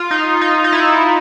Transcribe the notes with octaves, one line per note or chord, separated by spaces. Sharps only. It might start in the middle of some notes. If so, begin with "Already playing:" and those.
Already playing: F4
D#4
D#4
D#4
E4